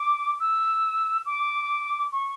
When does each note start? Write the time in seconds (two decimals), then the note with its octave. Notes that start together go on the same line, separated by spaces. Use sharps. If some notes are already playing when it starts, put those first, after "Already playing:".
Already playing: D6
0.40 E6
1.26 D6
2.12 C#6